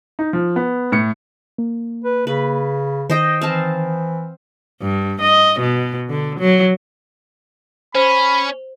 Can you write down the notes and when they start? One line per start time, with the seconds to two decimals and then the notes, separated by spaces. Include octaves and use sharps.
0.19 D#4
0.33 F3
0.56 B3
0.92 A2 C#7
1.58 A#3
2.04 B4
2.27 C#3 B4
3.10 D#3 C5 D#5 G5
3.41 E3 C4 F5 A5
4.82 G2
5.21 D#5
5.60 B2
6.09 D3
6.39 F#3
7.95 C#4 C5 B5